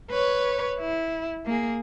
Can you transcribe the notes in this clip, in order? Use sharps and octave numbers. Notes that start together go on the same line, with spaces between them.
B4 C#5
E4
A#3 G#4